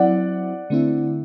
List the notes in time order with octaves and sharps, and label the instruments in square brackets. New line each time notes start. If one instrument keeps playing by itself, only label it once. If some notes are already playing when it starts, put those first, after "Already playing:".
Already playing: [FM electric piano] F#3 C4 E4 [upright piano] D5 F#5
[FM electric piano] D3 A3 C4 E4